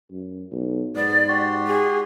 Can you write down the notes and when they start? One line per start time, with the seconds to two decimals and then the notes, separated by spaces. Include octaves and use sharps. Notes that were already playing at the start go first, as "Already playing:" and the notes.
0.12 F#2
0.51 B1
0.95 G#2 B3 D5
1.28 F#4 G4 C6
1.67 G#4